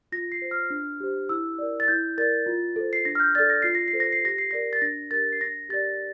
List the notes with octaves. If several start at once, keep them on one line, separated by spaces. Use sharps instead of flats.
F4 A#6
C7
C5
F6
D4
G4 C5
E4 E6
A#4 D5
A6
E4 G6
A#4 D5 A6
F4
A4 C5
C7
D4 A#6
F6
G6
A4 D5 A6
A#6
F4 C7
A#6
C7
A4 C5
A#6
C7
G4 A#6
C7
A#4 D5 A#6
A6
D4 A#6
G4 A#4 A6
C7
D4 A#6
G4 A#4 D5 A6